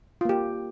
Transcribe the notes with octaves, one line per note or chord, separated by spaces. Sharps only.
A#3 F4 G4